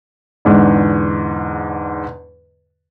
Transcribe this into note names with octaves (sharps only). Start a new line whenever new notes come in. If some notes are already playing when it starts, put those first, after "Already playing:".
E2 G#2 D3